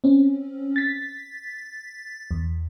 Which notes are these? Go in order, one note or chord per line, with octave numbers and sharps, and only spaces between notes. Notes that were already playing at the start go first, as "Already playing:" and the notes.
C4 C#4
A6 B6
E2